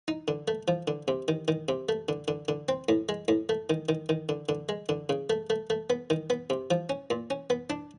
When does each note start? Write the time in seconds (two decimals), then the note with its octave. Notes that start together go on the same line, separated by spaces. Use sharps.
0.08 D#4
0.28 D3
0.48 A3
0.68 F3
0.88 D3
1.08 C3
1.28 D#3
1.48 D#3
1.69 C3
1.89 A3
2.09 D3
2.28 D3
2.48 D3
2.69 C4
2.89 A2
3.09 G#3
3.28 A2
3.49 A3
3.70 D#3
3.89 D#3
4.09 D#3
4.29 D3
4.49 D3
4.69 G#3
4.89 D3
5.09 C#3
5.30 A3
5.50 A3
5.70 A3
5.90 B3
6.10 D#3
6.30 B3
6.50 C3
6.71 F3
6.89 C#4
7.10 A#2
7.30 C#4
7.50 B3
7.70 D4